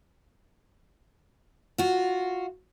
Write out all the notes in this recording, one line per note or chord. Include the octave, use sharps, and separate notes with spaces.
F4 F#4